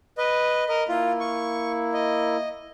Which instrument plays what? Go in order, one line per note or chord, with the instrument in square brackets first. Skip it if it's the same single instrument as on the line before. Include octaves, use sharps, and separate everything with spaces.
[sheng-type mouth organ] B4 D#5
A#4 D#5
[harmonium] A#3 E4 [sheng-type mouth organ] F4
[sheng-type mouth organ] C#6
D#5